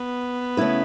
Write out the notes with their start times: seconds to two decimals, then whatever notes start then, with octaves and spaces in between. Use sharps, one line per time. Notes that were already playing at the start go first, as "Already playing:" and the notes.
Already playing: B3
0.57 C#3 A3 C#4 E4 B4